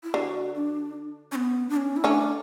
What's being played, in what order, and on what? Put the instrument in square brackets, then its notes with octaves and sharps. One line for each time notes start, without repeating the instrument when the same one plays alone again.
[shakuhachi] E4
[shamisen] D3 [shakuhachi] F#4
[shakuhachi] D4
C#4
B3
D4
C#4
E4
[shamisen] A3 C#4 [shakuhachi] D4